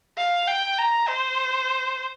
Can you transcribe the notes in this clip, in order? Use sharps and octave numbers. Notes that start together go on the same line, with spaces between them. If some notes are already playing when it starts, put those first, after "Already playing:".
F5
G5
A#5
C5